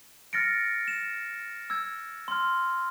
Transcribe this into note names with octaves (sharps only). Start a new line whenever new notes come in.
F6 A6 A#6 C#7 D7
E7
E6 G#6
C6 F6